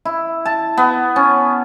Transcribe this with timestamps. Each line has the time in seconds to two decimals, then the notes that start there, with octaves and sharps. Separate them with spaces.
0.05 E4
0.46 A5
0.77 B3
1.16 C#4